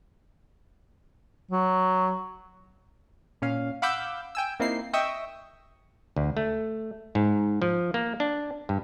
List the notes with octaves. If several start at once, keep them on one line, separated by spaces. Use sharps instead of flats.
F#3
A#2 C#4 F5
F5 F#5 B5 D6 E6 G6
G5 G#5 E6
A#3 C4 D#4 E4 C7
D#5 E5 G5 C#6 D#6 E6
D2
A3
G#2
F3
A#3
D4
G2